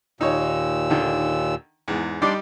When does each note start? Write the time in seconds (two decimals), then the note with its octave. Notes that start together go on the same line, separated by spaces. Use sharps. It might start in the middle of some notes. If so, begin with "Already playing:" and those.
0.21 D#2 A#2 D#4 C#5 E6
0.90 D3 D#3
1.88 E2 G#2
2.22 G3 D4 D#4 D5 C6 D6